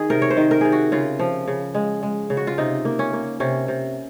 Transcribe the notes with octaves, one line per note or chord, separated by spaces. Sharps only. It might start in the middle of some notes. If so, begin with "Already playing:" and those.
Already playing: D#3 G#4
C3 A#4
C#5
C5
D#3
A#4
C3 G#4
F#4
C#3 F4
F3
C#3
G#3
G#3
C#3
F#4
F4
C3 D#4
A#3
C#4
A#3
C3 C#4
C3